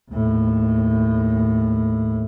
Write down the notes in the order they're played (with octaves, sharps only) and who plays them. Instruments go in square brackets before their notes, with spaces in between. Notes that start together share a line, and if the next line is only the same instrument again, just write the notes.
[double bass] D#2 A2